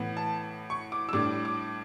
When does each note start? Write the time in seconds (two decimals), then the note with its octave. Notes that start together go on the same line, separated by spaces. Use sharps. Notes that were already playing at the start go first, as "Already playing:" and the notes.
Already playing: A2 E3 B3
0.17 A5
0.70 C#6
0.92 D6
1.09 E6
1.13 A2 G3 D4 D6
1.45 D6